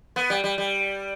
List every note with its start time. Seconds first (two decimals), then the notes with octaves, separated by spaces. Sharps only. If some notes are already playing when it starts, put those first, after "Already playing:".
0.16 B3
0.30 G3
0.44 G3
0.58 G3